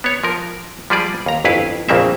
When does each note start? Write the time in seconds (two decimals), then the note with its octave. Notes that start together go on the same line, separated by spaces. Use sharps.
0.04 B3 C#5
0.24 F3 A#4
0.90 F3 G3 G#4 D5
1.26 D#2 A#5
1.45 G1 F2 E4 B4 F5
1.89 A#1 F2 C#3 A#3 C4 E5